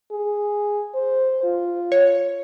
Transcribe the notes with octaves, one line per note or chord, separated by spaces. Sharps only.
G#4
C5
F4
C#5